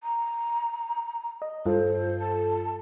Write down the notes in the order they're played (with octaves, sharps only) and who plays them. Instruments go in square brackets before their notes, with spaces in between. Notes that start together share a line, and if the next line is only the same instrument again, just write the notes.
[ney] A#5
[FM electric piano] D#5
[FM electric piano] G2 F4 A4 [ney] C5
[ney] A5